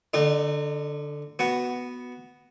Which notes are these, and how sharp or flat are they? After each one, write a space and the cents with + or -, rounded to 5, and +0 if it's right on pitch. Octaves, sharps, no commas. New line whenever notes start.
D3 +0 D#4 -35
B3 +0 F#4 +0